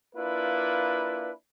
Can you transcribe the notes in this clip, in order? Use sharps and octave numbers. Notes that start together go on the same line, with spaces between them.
A#3 D4 E4 F4 B4